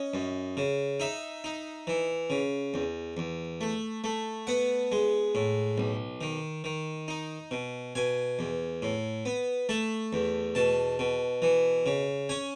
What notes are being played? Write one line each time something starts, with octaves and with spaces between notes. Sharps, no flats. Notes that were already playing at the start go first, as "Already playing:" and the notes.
Already playing: C#4 D#5
F#2
C#3
D#4 E5
D#4
E3
C#3
E2
E2
A3
A3
B3 F#5
G#3
A2
B1
D#3
D#3
D#4
B2
B2 G#5
E2
A2
B3
A3 A5
E2
B2 A5
B2
E3
C#3
C#4 G#5